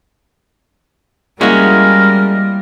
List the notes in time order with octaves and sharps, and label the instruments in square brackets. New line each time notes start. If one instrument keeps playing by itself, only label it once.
[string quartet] G3 [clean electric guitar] G#3 C#4 F#4 [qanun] A#3 E4 [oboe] A#4